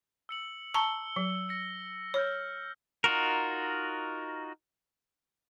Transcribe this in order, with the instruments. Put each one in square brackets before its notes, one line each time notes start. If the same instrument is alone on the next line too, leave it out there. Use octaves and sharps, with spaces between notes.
[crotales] E6 C#7 F#7
[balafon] A5 A#5 C#6 [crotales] E6 C#7 G7
[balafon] F#3
[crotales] A#6 C#7
[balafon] C#5 [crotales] E6 F6 G6
[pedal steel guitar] D#4 F4 F#4 A#4